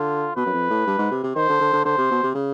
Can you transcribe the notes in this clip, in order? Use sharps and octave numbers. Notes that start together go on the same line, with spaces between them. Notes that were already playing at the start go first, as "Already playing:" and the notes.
Already playing: D3 F4
B2 B4
F#2
F2
A2
G2
G#2
C3
C3
D#3 C5
D3
D3
D3
D3 C5
C3
B2
C3
C#3